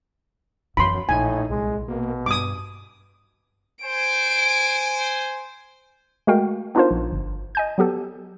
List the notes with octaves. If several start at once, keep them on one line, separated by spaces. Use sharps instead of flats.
F#2 E3 F#3 B3 B5 C6
A#1 A2 D#4 G#5
C2 G#3
B2 A#3
G2 D6 D#6
C5 G#5 D7
G#3 A3 F#4 A#4 F5 G5
B3 D4 D#4 F4 A#4 C5
A#1
G1
D#5 G#5 G6
F#3 B3 G4 A4